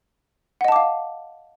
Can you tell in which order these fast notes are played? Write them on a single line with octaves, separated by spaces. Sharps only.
F#5 D#5 A5 D6 F5